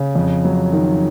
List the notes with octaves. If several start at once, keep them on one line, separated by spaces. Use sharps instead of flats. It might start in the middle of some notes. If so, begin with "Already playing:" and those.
Already playing: C#3
F2
F#3
D#3